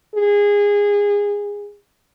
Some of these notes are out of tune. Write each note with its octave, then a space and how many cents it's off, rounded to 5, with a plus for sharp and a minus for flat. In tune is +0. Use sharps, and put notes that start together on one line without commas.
G#4 -20